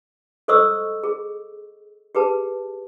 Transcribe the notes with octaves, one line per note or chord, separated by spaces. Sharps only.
A4 C5 D#5 C#6 D#6 E6
G#4
G4 G#4 B4 A5